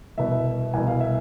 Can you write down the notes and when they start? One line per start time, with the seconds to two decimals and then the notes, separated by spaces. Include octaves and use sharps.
0.18 C2 B2 E5
0.74 C2 B2 G#5
0.87 F5
1.00 E5